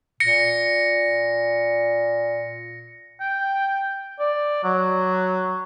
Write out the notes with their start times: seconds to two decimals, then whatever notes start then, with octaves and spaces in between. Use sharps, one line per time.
0.20 A#2 A#6 C#7
3.20 G5
4.20 D5
4.64 F#3